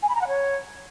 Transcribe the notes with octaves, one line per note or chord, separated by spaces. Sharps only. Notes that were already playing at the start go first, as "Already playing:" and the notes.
G#5
B5
A#5
F#5
C#5